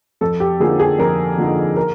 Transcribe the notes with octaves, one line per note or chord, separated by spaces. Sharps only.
F2 A4
G4
D3 F3 A#3 D#4 G#4
G#4
F2 A#4
D3 F3 A#3 D#4
A#4